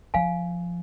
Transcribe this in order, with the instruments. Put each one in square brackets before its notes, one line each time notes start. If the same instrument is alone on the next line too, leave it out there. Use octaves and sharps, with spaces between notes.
[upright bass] F3 [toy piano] F5 G#5